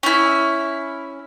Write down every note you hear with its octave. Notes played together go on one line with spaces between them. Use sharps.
C#4 E4